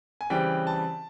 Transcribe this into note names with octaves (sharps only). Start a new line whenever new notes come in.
G#5
C#3 E3 G3 C4 G5
A5